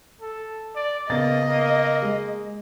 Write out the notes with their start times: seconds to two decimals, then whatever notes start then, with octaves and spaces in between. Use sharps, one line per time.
0.21 A4
0.76 D5
1.10 C#3 A#3 B3 D#5 A6
1.48 A#3
2.03 G#3